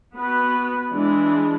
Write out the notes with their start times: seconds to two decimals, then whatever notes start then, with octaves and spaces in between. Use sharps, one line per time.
0.15 B3 F#4 B4
0.92 E3 G#3 D4